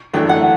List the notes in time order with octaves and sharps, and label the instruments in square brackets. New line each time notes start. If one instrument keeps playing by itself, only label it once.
[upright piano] F#2 E3 A3 D4 [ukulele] G5
[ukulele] F#5